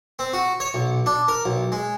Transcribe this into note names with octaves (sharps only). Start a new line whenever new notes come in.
C4
F#4
C#5
B1
D4
A#4
B1
G#3